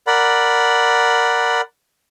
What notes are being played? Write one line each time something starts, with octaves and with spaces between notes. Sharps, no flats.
A#4 D5 F#5 B5